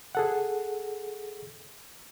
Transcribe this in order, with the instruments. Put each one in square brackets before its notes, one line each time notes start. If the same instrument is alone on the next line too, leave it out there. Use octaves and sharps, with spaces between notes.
[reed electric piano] G#4 A4 F#5